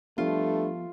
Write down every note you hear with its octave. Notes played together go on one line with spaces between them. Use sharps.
G2 F3 A3 B3 F4